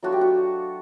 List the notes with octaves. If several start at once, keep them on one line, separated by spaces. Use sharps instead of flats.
F#3 A3 D4 F4 F#4
G4
F#4